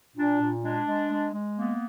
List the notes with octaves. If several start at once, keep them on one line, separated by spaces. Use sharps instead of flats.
A#2 D4
A#2
G#3 D4
G#3
G#3
G#3
A#3 B3